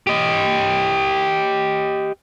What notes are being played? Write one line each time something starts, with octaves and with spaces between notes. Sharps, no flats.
G4 D#5